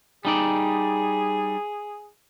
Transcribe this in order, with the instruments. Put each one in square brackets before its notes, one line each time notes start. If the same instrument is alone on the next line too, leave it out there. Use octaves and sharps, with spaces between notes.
[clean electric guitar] G3 D#4 D5 [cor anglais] G#4